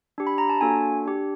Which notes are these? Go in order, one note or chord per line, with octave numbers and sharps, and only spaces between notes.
D4 G4
B5
A#5
A5
A#3 D4 F#4 A4 G#5
D4 G4